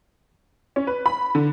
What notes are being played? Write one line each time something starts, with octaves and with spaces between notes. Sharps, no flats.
C#4
B4
B5
D3